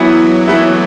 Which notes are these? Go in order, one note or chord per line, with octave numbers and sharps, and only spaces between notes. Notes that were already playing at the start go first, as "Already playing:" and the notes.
Already playing: E3 F#3 B3 E4
E3 A3 B3 E4